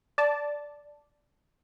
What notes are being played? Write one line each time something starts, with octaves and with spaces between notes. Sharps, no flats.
D5 A5